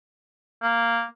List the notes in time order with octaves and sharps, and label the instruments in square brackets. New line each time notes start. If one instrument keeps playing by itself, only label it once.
[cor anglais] A#3